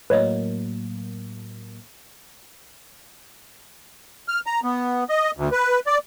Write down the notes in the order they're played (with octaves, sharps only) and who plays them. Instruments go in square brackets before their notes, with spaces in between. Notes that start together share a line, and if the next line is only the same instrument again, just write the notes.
[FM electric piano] A2 F#3 A#3 [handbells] B4 C#5 D#5
[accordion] F6
A#5
B3
D#5
D2
B4
D5